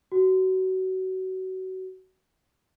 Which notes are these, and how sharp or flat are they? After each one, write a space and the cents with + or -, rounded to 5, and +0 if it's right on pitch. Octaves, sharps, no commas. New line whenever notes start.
F#4 +25